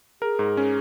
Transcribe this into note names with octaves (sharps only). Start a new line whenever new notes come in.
G#4 A#4
G#2
C#4